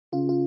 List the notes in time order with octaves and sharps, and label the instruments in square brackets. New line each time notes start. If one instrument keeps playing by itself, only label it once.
[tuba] C#3 [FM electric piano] F4
[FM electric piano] F4